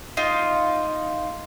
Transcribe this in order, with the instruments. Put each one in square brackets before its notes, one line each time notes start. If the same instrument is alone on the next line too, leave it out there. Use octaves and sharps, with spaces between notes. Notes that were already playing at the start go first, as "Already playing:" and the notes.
[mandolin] D#4 F4